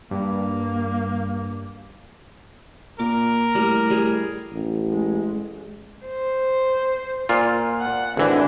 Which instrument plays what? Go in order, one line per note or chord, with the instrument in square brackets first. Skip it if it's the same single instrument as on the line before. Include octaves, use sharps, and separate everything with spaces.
[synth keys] G2 [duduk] A#3
[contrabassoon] A#2 [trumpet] A#4 [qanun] D6
[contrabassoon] A2 [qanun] G3
[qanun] G3 G#4
[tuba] A1
[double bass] G#3
[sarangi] C5
[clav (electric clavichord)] A#2 F4
[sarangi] F#5
[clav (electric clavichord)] G#1 E3 [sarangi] D3